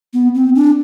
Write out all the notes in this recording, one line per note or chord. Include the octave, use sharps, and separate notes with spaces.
B3
C4
D4